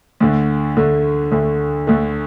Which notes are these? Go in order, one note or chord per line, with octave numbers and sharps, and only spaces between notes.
D2 D3 A3
D2 D3 A3
D2 D3 A3
D2 D3 A3